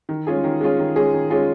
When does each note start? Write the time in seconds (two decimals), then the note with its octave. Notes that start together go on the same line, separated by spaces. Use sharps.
0.09 D#3
0.27 G#3 C#4 F4 G#4
0.44 D#3
0.61 G#3 C#4 F4 G#4
0.79 D#3
0.96 G#3 C#4 F4 G#4
1.14 D#3
1.30 G#3 C#4 F4 G#4